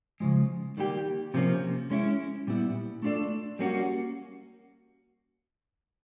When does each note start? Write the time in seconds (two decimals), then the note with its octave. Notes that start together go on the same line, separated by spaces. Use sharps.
0.20 C#3 F3 G#3
0.77 D#3 G3 A#3 D4 G4
1.34 C3 F3 A#3 C#4
1.90 G#3 C#4 E4
2.47 A#2 G3 B3 E4
3.02 A3 D4 F4 A4 D5
3.59 G3 A#3 C#4 F#4